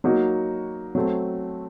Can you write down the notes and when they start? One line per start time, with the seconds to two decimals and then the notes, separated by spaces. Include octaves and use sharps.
0.04 F#3 A#3 D#4 F#4
0.95 F#3 A3 C4